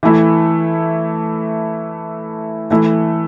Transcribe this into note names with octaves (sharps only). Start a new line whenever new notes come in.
E3 A3 E4
E3 A3 E4